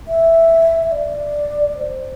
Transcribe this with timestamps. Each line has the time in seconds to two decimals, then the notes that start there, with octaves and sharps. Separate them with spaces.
0.08 E5
0.83 E5
0.92 D5
1.77 C5